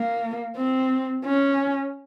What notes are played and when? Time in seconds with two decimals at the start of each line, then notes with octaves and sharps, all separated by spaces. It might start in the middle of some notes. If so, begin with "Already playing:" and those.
Already playing: A#3
0.57 C4
1.25 C#4